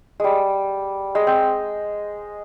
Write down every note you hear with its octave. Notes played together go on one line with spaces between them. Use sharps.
G3 G#3
G#3
C4